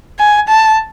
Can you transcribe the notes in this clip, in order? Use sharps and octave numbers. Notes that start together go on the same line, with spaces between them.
G#5
A5